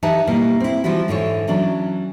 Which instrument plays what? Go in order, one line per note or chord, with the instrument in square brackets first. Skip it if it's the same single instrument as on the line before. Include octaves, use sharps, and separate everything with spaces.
[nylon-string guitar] E3 D#4 G4 E5 F#5 A5
B2 G3 A#3 E4
C4 E4
E3 F3 G3 E4 F#4
G#2 D3 E3 C#5
E3 F#3 C#4 D4